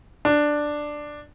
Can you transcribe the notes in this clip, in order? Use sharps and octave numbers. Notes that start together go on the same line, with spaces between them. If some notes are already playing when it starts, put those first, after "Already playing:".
D4